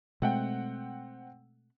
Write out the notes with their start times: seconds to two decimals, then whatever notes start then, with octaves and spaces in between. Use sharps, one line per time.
0.22 B2 G#3 A3 C4 F#5 G5